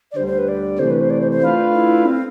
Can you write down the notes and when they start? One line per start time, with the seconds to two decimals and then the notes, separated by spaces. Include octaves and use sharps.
0.11 D5
0.16 D2 D3 G3 C5
0.26 C5
0.37 B4
0.47 D5
0.78 C3 E3 A3 C5
0.89 B4
1.00 C5
1.10 D5
1.20 C5
1.31 C5
1.42 A3 D4 F4 B4 F5
1.73 E4
2.05 C4